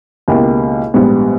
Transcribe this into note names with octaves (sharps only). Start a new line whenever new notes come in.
C#2 B2 A#3 E4 G4
A#1 G#2 G3 B3